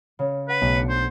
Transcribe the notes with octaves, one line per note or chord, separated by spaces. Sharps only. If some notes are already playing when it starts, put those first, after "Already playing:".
C#3 C#4
B4 F#5
B1 A3
D4 D5 C#7
C5